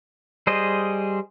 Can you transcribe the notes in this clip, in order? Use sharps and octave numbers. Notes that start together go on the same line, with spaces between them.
G3 G#4 C5 D#5